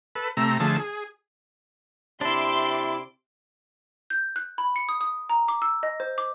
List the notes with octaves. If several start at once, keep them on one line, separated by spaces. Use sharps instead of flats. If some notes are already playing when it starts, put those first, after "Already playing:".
A4 B4
C3 A3 A#5 E6
D3 F3 A3 G#4 A5
G#4
C3 D4 E4 C6 D6
G6
F#6
B5
C#7
D#6
D#6
A#5
D6
E6
D#5
C5
D6